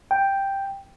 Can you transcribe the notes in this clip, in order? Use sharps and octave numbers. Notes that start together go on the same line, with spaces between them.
G5